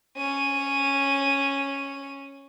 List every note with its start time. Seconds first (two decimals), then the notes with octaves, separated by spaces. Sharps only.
0.17 C#4 D#7